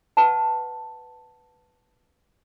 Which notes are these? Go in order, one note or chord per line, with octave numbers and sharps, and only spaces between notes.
B4 F#5 A5